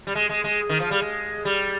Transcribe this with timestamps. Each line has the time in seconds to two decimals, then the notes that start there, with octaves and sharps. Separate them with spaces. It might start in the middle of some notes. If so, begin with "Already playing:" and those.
0.07 G3
0.15 G#3
0.29 G#3
0.44 G#3
0.69 D#3
0.80 F3
0.91 G3
1.02 G#3
1.45 G3